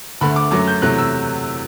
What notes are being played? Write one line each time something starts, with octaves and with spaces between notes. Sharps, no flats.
D2 D3 A3 B5
D6
F#2 F#3 A3 D6
G6
E2 C3 F#3 A3 F#6
E6